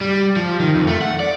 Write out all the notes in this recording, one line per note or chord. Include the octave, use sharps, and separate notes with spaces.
G3
F3
D#3
F2
A3
F#5
D5